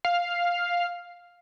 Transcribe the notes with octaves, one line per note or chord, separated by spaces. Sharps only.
F5